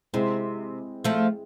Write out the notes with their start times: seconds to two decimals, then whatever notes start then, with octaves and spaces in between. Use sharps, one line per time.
0.13 C3 G#3 C4 E4 G#4
1.05 F3 A3